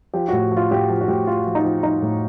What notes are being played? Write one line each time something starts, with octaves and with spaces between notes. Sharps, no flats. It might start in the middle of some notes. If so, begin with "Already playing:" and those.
F3 G4
A2 F#4
F3
F4
A2 G4
F3
F#4
A2 G4
F3 F4
F3
D#4
F3
F3 D#4
A2